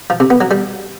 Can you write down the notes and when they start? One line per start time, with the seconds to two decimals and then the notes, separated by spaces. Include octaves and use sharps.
0.10 F3
0.20 C3
0.30 B3
0.41 F#3
0.51 G3